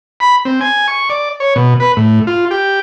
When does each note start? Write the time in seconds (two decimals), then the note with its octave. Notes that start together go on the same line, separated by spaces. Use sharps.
0.20 B5
0.45 C4
0.61 G#5
0.88 C#6
1.10 D5
1.40 C#5
1.55 B2
1.80 B4
1.97 A2
2.27 F4
2.51 G4